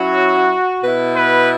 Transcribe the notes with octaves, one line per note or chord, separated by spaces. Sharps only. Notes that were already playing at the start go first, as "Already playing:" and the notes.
Already playing: F#3 C#4 E4 F#4
B2 B3 E4 B4
B4